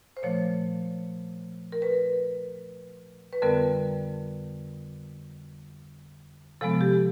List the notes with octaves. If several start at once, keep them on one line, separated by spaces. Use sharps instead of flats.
C5
A#2 F3 A3 C#5
A#4
B4
B4
F2 D3 G3 B3 A#4
C3 F3 G#3 B3 A4
G4